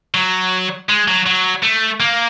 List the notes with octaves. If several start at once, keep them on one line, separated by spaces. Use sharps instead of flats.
F#3
G#3
F#3
F#3
A3
A#3